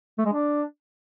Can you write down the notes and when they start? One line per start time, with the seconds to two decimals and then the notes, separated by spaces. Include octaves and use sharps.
0.19 A3
0.26 G#3
0.33 D4